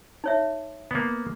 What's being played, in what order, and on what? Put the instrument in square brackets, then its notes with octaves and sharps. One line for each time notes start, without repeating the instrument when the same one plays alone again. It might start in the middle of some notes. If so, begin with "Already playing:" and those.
[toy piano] D#4 C#5 E5
[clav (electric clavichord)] A#3 B3